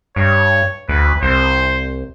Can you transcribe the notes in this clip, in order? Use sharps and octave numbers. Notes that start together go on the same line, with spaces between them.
G2 C#5
D2 B4
C2 C5